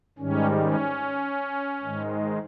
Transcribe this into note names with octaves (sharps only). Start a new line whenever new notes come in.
G#2 D#3 G3 C#4
C#4
G#2 D#3 G#3